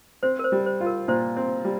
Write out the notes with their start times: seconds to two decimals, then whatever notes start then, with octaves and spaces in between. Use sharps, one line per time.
0.23 C4 C5
0.39 A#4
0.44 C5
0.52 G3
0.66 C5
0.81 F4
0.87 A#4
1.08 A#2 C5
1.37 C4
1.65 G3